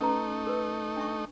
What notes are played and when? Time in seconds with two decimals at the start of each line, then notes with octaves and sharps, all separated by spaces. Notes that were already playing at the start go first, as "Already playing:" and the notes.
0.01 A3 C#4 D#4 B4 A#5
0.47 A#4 B4
0.97 D4 E5 C#6